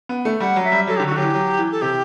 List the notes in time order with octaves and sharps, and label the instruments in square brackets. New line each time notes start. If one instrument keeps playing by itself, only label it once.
[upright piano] B3
A3
[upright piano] G3 [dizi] F#5
[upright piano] F#3
[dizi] E5
[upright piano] G3
[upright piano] F#3 [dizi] A4
[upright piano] D3 [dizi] G4
[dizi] F#4
[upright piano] D3
[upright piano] F#3 [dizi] G4
[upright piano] E3
F#3
E3
[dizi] A4
[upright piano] C3 [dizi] G4